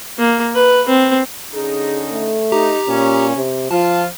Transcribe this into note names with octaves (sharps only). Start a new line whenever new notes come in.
A#3
B4
C4
D3 C#4 D#4 G#4
A3
D#4 G4 A#5
A#2 C#4
C3
F3 F4 A5